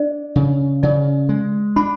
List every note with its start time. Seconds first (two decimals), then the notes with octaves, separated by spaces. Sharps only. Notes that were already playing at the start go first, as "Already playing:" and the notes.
Already playing: D4 D5
0.36 C#3
0.83 C#3 D5
1.29 G#3
1.76 D4 B5